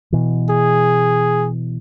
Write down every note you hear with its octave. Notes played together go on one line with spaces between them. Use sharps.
B2 E3
G#4